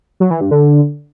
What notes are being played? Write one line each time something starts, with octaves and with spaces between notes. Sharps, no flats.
F#3
E3
G2
D3